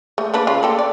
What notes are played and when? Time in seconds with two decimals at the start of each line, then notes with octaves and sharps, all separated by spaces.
0.18 A3
0.34 A#3 D4 B4
0.47 C#3 F4
0.63 A#3 A4 G5
0.79 D5